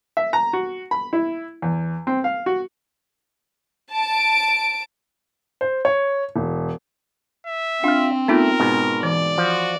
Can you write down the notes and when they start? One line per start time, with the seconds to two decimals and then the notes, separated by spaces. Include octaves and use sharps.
0.17 E5
0.33 A#5
0.53 F#4
0.91 B5
1.13 E4
1.62 E2
2.07 C4
2.24 F5
2.46 F#4
3.92 A5 D7
5.61 C5
5.85 C#5
6.36 E1
7.47 E5
7.84 C4 D4 F4 F5
8.28 A3 B3 D#4 F4 A#4
8.60 G#2 B2
9.03 E3 D5
9.38 F3 F#4